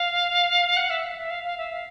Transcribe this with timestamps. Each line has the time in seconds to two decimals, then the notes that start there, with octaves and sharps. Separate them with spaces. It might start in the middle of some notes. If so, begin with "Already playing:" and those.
Already playing: F5
0.76 F#5
0.90 E5
1.04 F5
1.17 E5
1.30 F5
1.44 F5
1.58 E5
1.72 F5